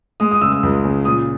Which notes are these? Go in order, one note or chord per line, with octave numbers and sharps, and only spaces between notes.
G#3 D#6
D#6
C#3 E6
E6
C#2
C#3
A#2 D#6